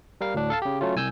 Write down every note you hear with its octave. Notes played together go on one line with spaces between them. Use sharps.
G3 A#4 F5
D2 A2 D4
A4 F5 A5
C#3 G4
F#3 A3 C#4 F4
C2 G#5 E6 G6